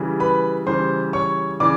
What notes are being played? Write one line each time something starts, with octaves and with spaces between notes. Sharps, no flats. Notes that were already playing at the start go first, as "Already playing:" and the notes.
Already playing: C#3 E3 G3
B4 B5
C#3 E3 G3 C5 C6
C#5 C#6
C#3 E3 D5 D6